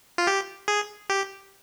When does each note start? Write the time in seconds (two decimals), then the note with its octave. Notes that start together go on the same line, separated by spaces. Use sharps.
0.18 F4
0.27 G4
0.68 G#4
1.10 G4